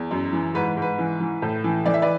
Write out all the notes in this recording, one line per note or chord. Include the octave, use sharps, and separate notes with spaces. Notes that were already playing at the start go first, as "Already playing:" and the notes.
Already playing: E2
F#2
E3
G#2 B4
G#2 B4
E3
E3
A2
E3
E3 D5
E5
B4 D5